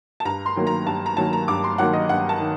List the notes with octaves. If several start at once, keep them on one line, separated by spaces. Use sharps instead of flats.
A5
G2 A#5
C6
D#3 F#3 A#3
A#5
G2 A5
A#5
D#3 F#3 A#3 A5
A#5
G2 D6
C6
D#3 F#3 A#3 F#5
D#5
G2 F#5
A5
D#3